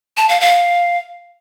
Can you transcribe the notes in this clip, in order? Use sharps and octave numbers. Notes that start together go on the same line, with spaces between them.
A5
F5
F5